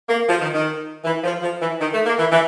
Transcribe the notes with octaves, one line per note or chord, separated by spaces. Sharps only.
A#3
F3
D#3
D#3
E3
F3
F3
E3
D#3
A3
A#3
E3
E3